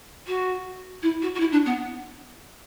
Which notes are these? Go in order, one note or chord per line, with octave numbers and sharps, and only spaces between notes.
F#4
E4
F#4
F#4
E4
D4
B3